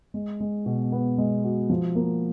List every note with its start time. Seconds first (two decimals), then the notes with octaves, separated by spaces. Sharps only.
0.14 G#3
0.40 G#3
0.66 B2
0.92 B3
1.18 G#3
1.44 F#4
1.69 F3
1.95 A#3